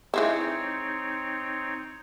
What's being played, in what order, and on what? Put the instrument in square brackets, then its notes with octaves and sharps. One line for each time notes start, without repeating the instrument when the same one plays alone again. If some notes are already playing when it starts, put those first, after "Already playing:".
[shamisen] E3 G#3 E4 [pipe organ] C4 D#4 C#5